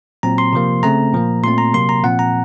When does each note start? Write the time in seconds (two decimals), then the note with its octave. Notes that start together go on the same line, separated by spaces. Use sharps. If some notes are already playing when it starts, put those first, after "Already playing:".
0.23 A#2 F#3 C4 A#5
0.38 C6
0.53 C3 F3 A#3
0.83 C#3 A3 C4 A#5
1.14 A#2 F3 A#3
1.43 A#2 A3 C4 C6
1.58 A#5
1.74 C3 F#3 A#3 C6
1.89 A#5
2.04 A#2 F3 C4 F#5
2.19 A#5